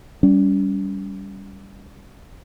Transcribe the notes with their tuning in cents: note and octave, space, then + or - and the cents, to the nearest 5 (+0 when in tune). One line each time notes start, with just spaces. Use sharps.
G3 +0 C#4 +30